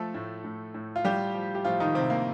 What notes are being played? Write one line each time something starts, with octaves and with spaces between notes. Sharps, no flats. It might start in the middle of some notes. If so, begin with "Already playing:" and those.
Already playing: F3 A3 A4
A2
A2
A2
F4
A2 G3 G4
F3
G4
A2 F3 F4
D#3 D#4
C3 F3 C4
A#3